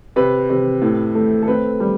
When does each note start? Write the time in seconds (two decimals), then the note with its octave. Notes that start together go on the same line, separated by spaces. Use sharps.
0.16 C3 B4
0.50 C3
0.82 A2
1.15 A3
1.43 A4
1.48 C4 B4
1.80 G3